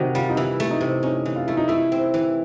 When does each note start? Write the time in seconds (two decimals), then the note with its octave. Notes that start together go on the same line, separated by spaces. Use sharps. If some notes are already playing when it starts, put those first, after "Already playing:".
Already playing: C3 D#3 F#4 G4
0.15 G3 F4
0.30 D#4
0.37 E3 E4
0.60 A3
0.70 D#4
0.81 C3
1.03 C#4 D#4
1.26 E3
1.36 F4
1.47 A3 E4
1.57 D#4
1.68 A3 E4
1.92 C4
2.14 E3